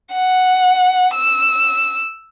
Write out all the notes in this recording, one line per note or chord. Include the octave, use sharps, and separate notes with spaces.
F#5
E6